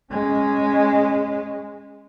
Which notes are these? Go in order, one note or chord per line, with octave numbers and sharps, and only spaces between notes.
G#3 C#4